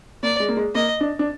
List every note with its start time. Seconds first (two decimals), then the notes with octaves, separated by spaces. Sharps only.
0.23 A#3 D5
0.40 G#3
0.49 A#3
0.57 G#3
0.75 A#3 D#5
1.01 D4
1.19 D4